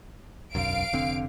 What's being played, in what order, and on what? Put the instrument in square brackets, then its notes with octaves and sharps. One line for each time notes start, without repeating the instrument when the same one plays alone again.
[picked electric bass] E1 B1 F#2 [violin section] F5 D7
[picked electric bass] F1 D3 C4